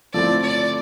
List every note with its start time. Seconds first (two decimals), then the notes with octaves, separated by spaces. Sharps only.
0.13 F3 A3 C4 E4 D5
0.42 D5